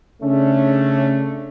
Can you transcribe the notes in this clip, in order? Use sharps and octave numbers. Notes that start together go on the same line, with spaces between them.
C#3 A3 C#4 D4